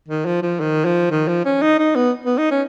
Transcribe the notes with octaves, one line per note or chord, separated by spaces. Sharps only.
D#3
F3
F3
D#3
F3
D#3
F3
C#4
D#4
D#4
B3
B3
D#4
C#4